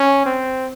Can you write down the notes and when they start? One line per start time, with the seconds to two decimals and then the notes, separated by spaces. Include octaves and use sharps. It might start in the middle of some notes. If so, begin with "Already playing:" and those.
Already playing: C#4
0.26 C4